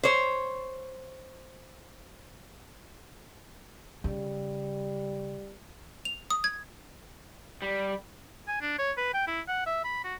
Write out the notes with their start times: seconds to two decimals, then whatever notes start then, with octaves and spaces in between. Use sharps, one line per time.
0.03 C5 C#5
4.04 C#3 G3
6.05 F7
6.30 D#6
6.44 G#6
7.62 G3
8.48 G#5
8.61 D4
8.79 C#5
8.97 B4
9.14 G5
9.27 E4
9.48 F#5
9.66 E5
9.84 B5
10.04 F#4